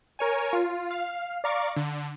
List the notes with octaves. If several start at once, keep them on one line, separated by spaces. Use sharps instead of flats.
A#4 C#5 G#5
F4
F5
D5 F5 A#5 C#6 D6
D3